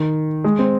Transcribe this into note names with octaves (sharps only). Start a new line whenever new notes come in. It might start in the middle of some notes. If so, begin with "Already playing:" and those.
Already playing: D#3
G#3
C4